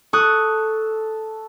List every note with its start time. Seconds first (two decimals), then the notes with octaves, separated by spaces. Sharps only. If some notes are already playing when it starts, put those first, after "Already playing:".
0.13 A4 C#6 D#6 F#6